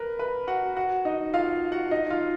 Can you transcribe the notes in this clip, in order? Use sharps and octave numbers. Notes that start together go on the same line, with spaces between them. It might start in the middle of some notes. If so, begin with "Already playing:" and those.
Already playing: A#4 B4
B4
F#4 F#5
F#4 F#5
D#4 D#5
F4 F5
F#4 F#5
D#4 D#5
F4 F5